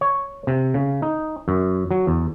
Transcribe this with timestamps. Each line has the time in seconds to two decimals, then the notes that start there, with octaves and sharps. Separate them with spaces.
0.01 C#5
0.47 C3
0.74 C#3
1.02 D#4
1.48 F#2
1.91 F#3
2.07 E2